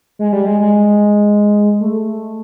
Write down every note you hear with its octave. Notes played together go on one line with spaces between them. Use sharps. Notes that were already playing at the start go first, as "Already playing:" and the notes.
G#3
G3
G#3
G#3
A3